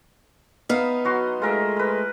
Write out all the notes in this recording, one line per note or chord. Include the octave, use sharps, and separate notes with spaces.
B3 D#4 E5 F5
F#3 F#4 C6
G#3 A3 F4 A#4 E5
A#4 B4